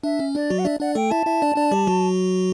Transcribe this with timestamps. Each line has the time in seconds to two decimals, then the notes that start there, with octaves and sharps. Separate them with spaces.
0.04 D4 E5
0.19 C#4
0.35 D4 D5
0.50 F#3 F#4
0.59 F#5
0.65 D4 D5 E5
0.80 D4 D5 F#5
0.95 A3 A4 G5
1.10 E4 E5 A5
1.27 E4 E5
1.42 D4 D5
1.56 D4 D5
1.71 G3 G4
1.87 F#3 F#4